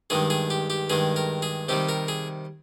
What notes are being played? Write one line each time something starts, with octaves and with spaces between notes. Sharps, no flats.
G2 D#3 G#3 G#4
G#4
G4
G4
G2 D#3 G#3 G#4
A#4
G#4
C3 D#3 G3 G4
A#4
G#4